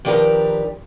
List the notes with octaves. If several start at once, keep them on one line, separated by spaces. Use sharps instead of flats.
D#3 F3 D4 G4 A#4 B4